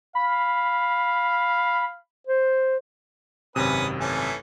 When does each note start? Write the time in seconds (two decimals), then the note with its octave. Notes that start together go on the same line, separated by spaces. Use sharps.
0.15 F5 B5
2.27 C5
3.56 G#1 F#2 C3 C#4 B4 D#6
4.00 E3 A3 C#4